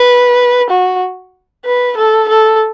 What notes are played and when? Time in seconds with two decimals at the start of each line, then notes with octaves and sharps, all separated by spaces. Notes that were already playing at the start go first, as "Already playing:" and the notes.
Already playing: B4
0.70 F#4
1.65 B4
1.97 A4
2.29 A4